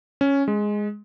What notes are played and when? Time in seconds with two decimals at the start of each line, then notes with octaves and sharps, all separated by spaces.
0.21 C#4
0.48 G#3